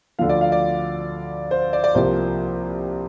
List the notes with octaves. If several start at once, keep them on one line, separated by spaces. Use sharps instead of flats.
D2 D3 F3 F5
D5
F5
D5
C5
D5
D5
C2 C3 F3 A#3 C5